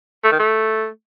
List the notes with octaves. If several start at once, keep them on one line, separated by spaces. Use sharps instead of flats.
A3
D#3
A3